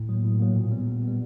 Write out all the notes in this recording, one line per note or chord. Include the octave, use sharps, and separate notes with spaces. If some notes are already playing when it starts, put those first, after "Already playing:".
Already playing: A2
F#3 A#3
A2
F#3 A#3
A#2
G3 B3
A#2
G3 B3